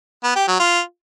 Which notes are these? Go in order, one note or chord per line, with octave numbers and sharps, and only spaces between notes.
B3
G4
F#3
F4